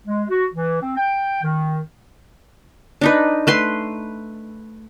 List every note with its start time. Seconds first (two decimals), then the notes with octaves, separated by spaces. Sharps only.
0.07 G#3
0.30 F#4
0.54 E3
0.81 C4
0.97 G5
1.43 D#3
3.01 D4 D#4 B4
3.47 A3 B4 C6